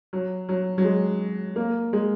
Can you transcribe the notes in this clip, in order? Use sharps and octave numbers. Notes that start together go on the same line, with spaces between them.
F#3
F#3
F#3
G#3
A#3
G#3